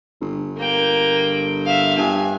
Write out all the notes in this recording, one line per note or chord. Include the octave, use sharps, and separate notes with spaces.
G1
A#3 G5
E5 F5
G2 G#5